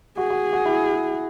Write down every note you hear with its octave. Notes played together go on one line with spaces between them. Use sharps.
F#4 G#4
F#4
F#4
E4